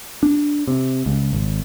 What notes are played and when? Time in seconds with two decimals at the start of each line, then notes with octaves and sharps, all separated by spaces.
0.23 D4
0.68 C3
1.06 C#2
1.33 G#1